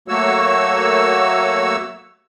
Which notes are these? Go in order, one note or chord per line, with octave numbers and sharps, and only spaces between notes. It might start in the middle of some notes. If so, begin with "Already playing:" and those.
F#3 A3 A#3 F#4 C#5 E6